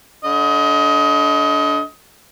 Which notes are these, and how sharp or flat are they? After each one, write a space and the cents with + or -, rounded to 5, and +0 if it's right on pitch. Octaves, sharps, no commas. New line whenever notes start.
D3 -25 D#5 +25